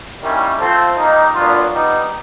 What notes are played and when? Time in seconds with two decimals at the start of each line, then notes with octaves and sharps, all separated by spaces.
0.22 D#3 G3 A#3 C#4 E4
0.59 A3 C4 F4 A4 C5
0.96 G3 A#3 D#4
1.34 A#2 F#3 B3 D4 F4
1.71 G3 B3 D#4